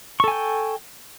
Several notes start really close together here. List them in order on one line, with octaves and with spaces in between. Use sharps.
C#6 A4 G#5 G5